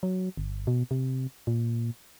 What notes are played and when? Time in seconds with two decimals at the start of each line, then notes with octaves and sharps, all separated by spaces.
0.03 F#3
0.37 G1
0.67 B2
0.91 C3
1.47 A#2